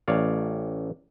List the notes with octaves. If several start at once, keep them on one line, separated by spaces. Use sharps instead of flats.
A1 C#5 D5 F5